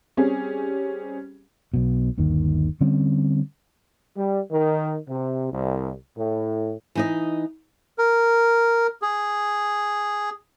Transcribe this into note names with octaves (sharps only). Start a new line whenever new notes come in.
G3 C4 C#4 G4 G#4
B1 B2
G1 D#2 D#3
D3 G3 C4 C#4
G3
D#3
C3
C2
A2
E3 D#4 D#5
A#4
G#4